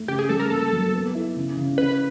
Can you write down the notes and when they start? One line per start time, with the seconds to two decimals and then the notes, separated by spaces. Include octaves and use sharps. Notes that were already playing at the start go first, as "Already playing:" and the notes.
Already playing: A3
0.08 C#3 G4
0.19 G#4
0.29 G3 A4
0.40 A#4
0.50 A#3 A4
0.72 F#3
0.93 B3
1.15 E4
1.36 C#3
1.57 C#3
1.78 C#3 B4